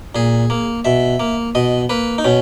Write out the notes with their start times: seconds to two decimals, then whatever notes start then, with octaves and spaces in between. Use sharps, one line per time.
0.15 A#2 G#4
0.50 A#3
0.85 B2 E5
1.20 A#3
1.55 B2 D#5
1.89 A#3 B4
2.18 D#4
2.24 B2 C#4